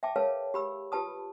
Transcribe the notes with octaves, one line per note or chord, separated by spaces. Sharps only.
E5 G5 A5 D6
G#4 A#4 B4 C#5 F5 A5
G4 B5 E6
F4 G4 B4 A5 D#6